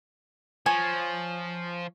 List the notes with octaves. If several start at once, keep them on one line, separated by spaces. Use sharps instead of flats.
F3 C#5 G#5